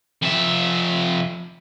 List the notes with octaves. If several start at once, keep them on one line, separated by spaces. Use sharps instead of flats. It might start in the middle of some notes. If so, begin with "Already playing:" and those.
F2 E5